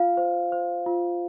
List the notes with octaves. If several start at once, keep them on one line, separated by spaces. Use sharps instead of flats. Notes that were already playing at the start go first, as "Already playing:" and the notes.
Already playing: F4 F5
C5
C5
F4